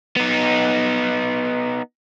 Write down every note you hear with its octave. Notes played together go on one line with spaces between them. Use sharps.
B3 D#4